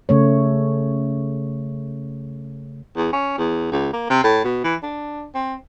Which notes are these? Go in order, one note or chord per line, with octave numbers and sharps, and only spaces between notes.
C#3 A3 C#5
E2
C#4
E2
C#2
A#3
C3
A2
B2
E3
D4
C4